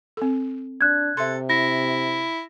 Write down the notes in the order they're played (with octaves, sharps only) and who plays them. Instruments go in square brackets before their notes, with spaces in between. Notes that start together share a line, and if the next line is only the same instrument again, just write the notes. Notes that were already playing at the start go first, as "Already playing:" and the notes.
[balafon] C4 A4
[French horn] D4 [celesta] F#6 G#6
[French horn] C3 [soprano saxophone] A4 [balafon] E5 C6
[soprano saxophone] E4 [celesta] A#6